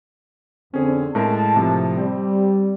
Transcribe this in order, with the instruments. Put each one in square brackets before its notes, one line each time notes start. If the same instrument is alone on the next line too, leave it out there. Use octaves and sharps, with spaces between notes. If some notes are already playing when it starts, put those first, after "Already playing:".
[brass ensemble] F2 D3 C4 [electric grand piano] C#4 G#4
[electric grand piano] A2 G#3 A#4 [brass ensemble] A5
[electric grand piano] A2 C3 F3
[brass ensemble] G3 [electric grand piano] C4